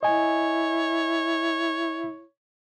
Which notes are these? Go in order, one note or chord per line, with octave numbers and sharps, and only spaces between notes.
E4 C#5 D#5 G#5